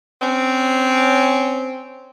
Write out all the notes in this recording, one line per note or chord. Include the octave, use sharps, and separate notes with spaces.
C4 C#4